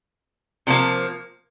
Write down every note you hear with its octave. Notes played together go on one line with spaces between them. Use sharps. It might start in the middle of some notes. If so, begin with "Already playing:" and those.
C3 F3 A#3